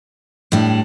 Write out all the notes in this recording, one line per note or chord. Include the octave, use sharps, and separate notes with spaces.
A2 G3 D4